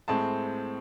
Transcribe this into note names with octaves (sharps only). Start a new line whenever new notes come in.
A2 G#3 C4 A5